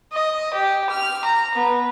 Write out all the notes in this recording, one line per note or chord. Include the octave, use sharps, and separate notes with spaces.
D#5
G4
F6
A#5
B3